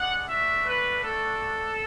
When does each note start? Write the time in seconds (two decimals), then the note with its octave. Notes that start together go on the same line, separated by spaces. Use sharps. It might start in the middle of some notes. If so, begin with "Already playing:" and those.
Already playing: G#3 D4 F#5
0.28 A3 D4 F#4 E5
0.65 B4
1.02 A4